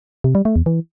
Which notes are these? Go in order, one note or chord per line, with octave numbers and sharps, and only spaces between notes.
C3
G3
A3
E2
E3